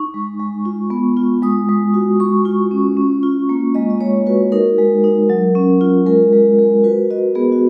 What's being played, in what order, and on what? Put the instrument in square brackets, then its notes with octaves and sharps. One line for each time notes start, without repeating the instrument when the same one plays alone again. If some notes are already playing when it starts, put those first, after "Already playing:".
Already playing: [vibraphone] D#4 C#6
G#3
G#3
F4
B3
F4
G#3 D#6
G#3
F#4
G#3 C#6
F4
C#4
C#4
F4
A#3
G#3 D#5
D#5
G#3 C#5
F#4 B4
D#4 A#4
G#3
D#4
F#3
C#4
F4
G#3 A#4
G#3
G#3
F#4 B4
F#4 D#5
B3 G#4
F#4